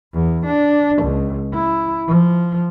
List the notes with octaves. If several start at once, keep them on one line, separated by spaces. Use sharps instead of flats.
E2
D4
C#2
E4
F3